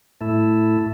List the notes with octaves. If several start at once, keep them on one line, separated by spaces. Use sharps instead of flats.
A2 A3 E4